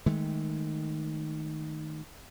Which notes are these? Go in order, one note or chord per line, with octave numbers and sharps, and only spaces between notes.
D#3 G#3 A3